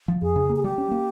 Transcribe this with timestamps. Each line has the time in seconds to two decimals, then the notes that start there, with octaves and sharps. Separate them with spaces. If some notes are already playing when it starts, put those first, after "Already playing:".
0.08 F3
0.22 F2 G#4
0.36 C#3
0.50 A#3
0.56 G#4
0.63 G3 G4
0.78 C#4
0.91 A#3